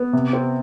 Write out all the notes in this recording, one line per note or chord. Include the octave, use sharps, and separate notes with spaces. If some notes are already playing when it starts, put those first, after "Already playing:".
Already playing: B3
C3
C4